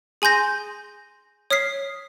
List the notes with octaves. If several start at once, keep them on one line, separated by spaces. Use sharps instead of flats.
G#4 G#5 C6 G6 A#6
C#5 D#6 F6 B6 C7